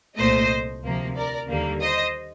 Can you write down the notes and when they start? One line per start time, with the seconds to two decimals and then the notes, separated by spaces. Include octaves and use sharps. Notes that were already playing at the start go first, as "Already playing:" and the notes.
0.17 C2 A#2 A3 C5 D#5
0.83 D2 C3 F3 A#3
1.16 A#4 D5
1.49 D#2 D3 G3 A#3
1.81 C5 D#5